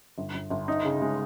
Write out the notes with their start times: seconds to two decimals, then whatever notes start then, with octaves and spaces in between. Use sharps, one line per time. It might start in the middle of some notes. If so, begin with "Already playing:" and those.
0.18 G1
0.34 G1
0.50 G1
0.68 D#4
0.85 C#3
1.02 G#3